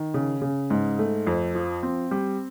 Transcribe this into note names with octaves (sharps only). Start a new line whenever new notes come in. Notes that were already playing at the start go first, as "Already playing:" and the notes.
Already playing: D#3
C#3
C#3
G#2
A3
F2
F3
C4
G3